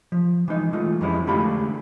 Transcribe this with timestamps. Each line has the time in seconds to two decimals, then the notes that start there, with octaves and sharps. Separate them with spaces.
0.12 F3
0.48 E3 G#3 D#4
0.73 E3 G#3 A3 F4
1.01 F2 E3 G3 G#3 C#4 E4
1.27 D3 G#3 A3 G4 F5 B5